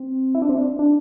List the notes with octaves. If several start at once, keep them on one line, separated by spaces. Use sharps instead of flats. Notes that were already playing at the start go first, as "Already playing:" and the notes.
Already playing: C4
E4
D4
C4
D4
D4